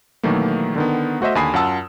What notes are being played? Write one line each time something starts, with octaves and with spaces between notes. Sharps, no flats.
B2 D#3 E3 F#3 A3 A#3
D3 D#3 B3
A3 F#4 C5 D#5 E5
D#2 D3 G#5 B5 D#6 C7
F#2 F4 F#5 A5 E6